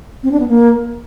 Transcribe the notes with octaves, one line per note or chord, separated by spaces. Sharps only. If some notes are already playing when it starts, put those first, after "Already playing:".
C4
D4
B3
A#3